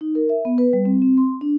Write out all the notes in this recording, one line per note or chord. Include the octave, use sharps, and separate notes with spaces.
D#4
A#4
E5
B3
B4
G3
C4
C4
C6
D4